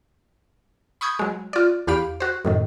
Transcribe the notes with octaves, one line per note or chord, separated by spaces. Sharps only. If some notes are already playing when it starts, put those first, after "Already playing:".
B5 C#6 D#6 G6 G#6
F#3 G#3
F4 D5
E2 G4 F5 B5 D7
F#4 C5
F#2 A2 D#3